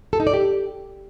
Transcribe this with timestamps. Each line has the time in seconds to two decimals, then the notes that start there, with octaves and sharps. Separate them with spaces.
0.13 A4
0.20 D#4
0.27 D5
0.34 G4